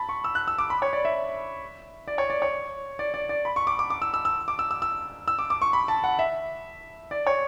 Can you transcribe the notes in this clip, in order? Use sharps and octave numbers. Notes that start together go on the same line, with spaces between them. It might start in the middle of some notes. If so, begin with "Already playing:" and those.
Already playing: A5 B5
C#6
E6
F#6
E6
D6
B5
C#5
D5
E5
D5
C#5
D5
C#5
D5
D5
D5
B5
C#6
D6
D6
D6
E6
E6
E6
D6
E6
E6
E6
E6
D6
D6
C#6
B5
A5
F#5
E5
D5
C#5